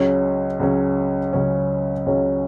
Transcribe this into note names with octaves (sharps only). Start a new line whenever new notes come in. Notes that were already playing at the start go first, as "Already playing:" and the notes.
Already playing: C#2 C#3 F#3 C#4
C#2 C#3 F#3 C#4
C#2 C#3 F#3 C#4
C#2 C#3 F#3 C#4